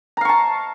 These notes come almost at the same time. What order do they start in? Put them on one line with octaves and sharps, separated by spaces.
A#5 F5 C#6 A5